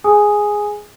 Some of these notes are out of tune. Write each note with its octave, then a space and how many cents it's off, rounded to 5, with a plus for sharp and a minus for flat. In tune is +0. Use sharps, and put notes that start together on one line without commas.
G#4 +0 G#5 +0 D#6 +0